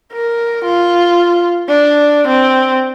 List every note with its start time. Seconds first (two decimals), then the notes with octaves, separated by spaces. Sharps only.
0.13 A#4
0.65 F4
1.69 D4
2.28 C4